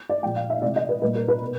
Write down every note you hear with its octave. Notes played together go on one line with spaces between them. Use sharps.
D5
A#2 F3 G#3 G5
F5
E5
C3 E3 G#3 D5
D#5
B4
A#2 G3 A#3 B4
A#4
B4
B2